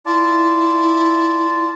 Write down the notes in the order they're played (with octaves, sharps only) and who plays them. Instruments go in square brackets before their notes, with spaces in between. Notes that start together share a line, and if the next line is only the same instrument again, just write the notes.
[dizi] E4 [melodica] F4 D5 A5